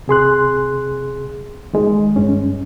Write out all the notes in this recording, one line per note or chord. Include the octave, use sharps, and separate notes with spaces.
C3 G#4 C6 F#6
D#3 G#3
G2 C#4